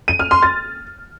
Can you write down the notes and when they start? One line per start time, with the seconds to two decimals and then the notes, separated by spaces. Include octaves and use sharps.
0.08 D#7
0.19 F6
0.31 C6
0.43 A6